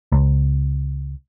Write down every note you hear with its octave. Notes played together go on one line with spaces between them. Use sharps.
C#2